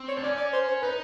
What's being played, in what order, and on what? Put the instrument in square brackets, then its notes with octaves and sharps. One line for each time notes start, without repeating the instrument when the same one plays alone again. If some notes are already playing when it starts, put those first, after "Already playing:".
Already playing: [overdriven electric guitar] C4
[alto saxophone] C#5
[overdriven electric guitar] D4
[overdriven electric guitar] C#4 [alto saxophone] D5
[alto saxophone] D5
C5
C5
[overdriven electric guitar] D#4 [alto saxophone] B4